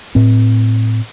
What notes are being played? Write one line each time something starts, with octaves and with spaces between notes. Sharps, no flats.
A2 C4